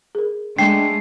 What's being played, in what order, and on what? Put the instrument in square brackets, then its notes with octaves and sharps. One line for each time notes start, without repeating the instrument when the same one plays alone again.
[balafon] G#4 A#4
[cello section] G#3 A3 [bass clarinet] D4 [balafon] G5 [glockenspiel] C7